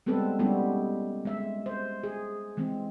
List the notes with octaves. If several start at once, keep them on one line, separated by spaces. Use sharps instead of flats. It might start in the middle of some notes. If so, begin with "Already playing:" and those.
G3 G#3 B3 C4 A4 B4
G3 G#3 B3 C#4 E4 G4
G#3 E5
C5
G#4
E3 G#3 C4